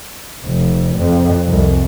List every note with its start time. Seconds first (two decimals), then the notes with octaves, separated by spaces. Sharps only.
0.45 F1
0.98 F2
1.47 C2